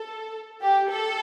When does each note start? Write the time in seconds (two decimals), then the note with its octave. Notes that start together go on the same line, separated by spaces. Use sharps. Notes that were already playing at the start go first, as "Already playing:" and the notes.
Already playing: A4
0.62 G4
0.89 A4